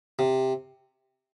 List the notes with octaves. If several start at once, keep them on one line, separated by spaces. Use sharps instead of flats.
C3